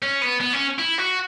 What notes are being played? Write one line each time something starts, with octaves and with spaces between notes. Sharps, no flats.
C#4
B3
B3
C#4
E4
F#4